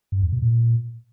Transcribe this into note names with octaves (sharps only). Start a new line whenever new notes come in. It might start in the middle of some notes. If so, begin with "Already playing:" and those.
G2
E2
B2
A#2